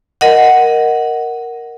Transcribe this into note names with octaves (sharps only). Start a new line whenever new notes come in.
A#4 D#5 F#5